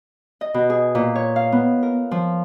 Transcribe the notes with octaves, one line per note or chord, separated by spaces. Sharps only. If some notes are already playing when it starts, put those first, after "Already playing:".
D#5
B2
G#4
A#2
C#5
F5
B3
A#4
F3